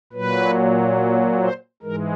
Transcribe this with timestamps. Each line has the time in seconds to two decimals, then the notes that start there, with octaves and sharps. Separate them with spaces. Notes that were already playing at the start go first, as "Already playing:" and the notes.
0.13 A#2 F#3 B4
1.41 C5
1.83 G#2 E3 G#3 A#4